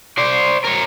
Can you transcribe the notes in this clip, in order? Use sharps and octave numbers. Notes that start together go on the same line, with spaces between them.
C5 D5
A#4 C#5